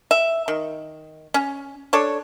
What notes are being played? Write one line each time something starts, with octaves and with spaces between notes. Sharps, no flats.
E5
D#3
C#4
D4 A4 C#5